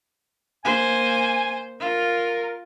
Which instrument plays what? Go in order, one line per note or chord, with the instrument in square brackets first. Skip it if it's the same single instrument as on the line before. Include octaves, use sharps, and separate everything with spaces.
[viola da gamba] A#3 C5 [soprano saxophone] G#5
[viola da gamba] F4 [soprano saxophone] A#4